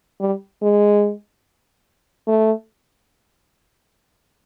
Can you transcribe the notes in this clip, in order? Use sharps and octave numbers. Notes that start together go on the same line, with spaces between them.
G3
G#3
A3